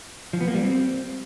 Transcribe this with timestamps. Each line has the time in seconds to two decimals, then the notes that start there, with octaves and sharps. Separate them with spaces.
0.33 F3
0.41 B3
0.48 A#3
0.55 G3
0.62 C4